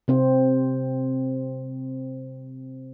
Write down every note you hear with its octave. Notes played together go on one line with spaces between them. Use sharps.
C3 C4 C5